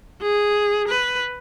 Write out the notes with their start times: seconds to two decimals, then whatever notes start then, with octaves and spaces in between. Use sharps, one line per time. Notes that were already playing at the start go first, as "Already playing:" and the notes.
0.21 G#4
0.88 B4